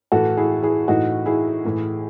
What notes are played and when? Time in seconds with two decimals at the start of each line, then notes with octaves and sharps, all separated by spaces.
0.12 A2 E3 F#4 A4
0.37 E4 G#4
0.62 E4 G#4
0.88 A2 E3 D#4 F#4
1.26 E4 G#4
1.65 A2 E3